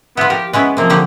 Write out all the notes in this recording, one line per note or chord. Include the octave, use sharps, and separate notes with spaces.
F3 B3 E4
G4 A#4
G#3 B3 C#4 E4
C3 F3 A#3 C4
D3 F#3 G4